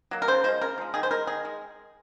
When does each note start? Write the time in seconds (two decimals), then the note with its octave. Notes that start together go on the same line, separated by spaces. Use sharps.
0.11 F#3 A#3
0.22 A#4
0.28 C#3 C5
0.44 F3 G#3 C5
0.61 C#3 A#4
0.78 F3 G#3
0.94 D#3 G#4
1.03 C5
1.11 G#3 A#4
1.27 D#3 G#4
1.45 G#3